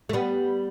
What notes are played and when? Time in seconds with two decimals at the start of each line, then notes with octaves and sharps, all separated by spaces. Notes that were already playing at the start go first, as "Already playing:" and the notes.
0.09 A3
0.13 G3 B3